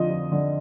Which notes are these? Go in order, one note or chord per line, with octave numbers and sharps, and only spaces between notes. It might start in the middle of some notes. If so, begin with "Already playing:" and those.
Already playing: F2 D3 F3 D#5
F2
D3